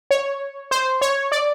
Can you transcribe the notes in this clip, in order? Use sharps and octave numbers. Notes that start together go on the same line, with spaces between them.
C#5
C5
C#5
D5